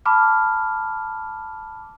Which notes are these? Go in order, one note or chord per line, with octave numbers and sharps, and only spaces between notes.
A5 B5 D6 F6